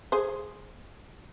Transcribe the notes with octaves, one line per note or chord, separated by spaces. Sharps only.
G#4 C5